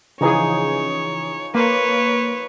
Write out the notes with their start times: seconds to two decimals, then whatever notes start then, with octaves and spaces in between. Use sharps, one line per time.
0.21 C#3 E3 F3 D#4 G#4 C#5 G#5
1.55 A#3 B4 C#5 C6